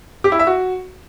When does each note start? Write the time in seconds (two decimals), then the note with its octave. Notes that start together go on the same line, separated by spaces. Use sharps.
0.24 G4
0.32 E4
0.39 E5
0.47 F#4